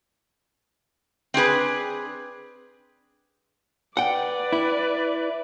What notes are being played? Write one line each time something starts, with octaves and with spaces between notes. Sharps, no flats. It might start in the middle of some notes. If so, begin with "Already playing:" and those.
C4 D4 G#4 B4
B4 D5 F#5 G5
E4